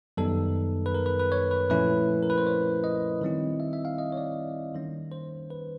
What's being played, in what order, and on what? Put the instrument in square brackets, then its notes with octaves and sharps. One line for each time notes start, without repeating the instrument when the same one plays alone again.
[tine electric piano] F#2 D#3 G3 B3 D#4 A4
B4
A#4
B4
B4
C#5
B4
A#2 F3 A3 C#4 E4 B4
A#4
B4
C5
C#5
D#5
D#3 G3 C4 E4
E5
E5
F5
D#5
C#5
D5
D#3 G3 A#3 C#4
C5
B4